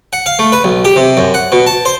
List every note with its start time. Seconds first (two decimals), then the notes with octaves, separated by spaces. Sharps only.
0.13 F#5
0.26 F5
0.39 A3
0.52 B4
0.64 B1
0.85 G4
0.96 C3
1.17 F#2
1.34 F#5
1.52 B2
1.66 A5
1.85 C5